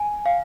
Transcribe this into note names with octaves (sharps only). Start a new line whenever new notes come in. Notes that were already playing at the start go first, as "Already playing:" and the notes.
Already playing: G#5
F5